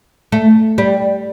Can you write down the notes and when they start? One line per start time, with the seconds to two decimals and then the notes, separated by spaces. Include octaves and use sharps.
0.32 A3
0.78 G3